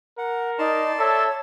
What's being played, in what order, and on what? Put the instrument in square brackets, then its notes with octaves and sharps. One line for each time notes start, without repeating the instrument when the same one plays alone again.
[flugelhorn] A#4 [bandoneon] F#5
[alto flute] D#4 [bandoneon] D5 A5 C6
[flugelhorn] A4 [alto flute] C#5 [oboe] E5